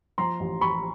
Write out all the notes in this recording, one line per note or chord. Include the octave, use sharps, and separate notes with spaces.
F3 A#5 C6
A1
A1 B5 C#6